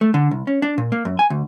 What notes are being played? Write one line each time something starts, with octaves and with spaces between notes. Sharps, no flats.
A3
D3
C2
C#4
D4
A#2
A#3
F#2
G#5
D2